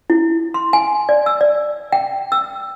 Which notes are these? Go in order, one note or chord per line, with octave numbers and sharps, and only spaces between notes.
E4
C6
G#5
D5
E6
D5
G5
E6